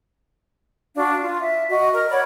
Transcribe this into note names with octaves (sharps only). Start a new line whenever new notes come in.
D4 F#4 F5 C#6
F4
E5
F#4 D#5
A#4 F6
C#5 D5 F#5 B5